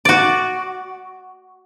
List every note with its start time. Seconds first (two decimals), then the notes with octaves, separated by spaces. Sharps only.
0.05 F#4 D5